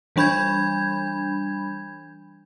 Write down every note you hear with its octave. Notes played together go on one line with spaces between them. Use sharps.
E3 G3 D4 B5 G6 G#6